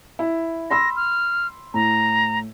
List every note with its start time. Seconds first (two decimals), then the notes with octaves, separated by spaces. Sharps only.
0.19 E4
0.71 B5 C6 E6 A#6
0.96 F6
1.74 A2 A#5